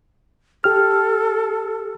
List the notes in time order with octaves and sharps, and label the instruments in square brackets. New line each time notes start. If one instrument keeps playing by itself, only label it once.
[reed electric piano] G4 F6 [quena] A4